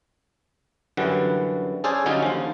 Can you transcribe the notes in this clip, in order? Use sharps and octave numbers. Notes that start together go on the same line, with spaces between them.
F#2 D3 E3 G3 F#5
C#4 G#4 A4 C5 D5 G#5
D3 F#3 G3 C#4 D#4 F4
D#2 F3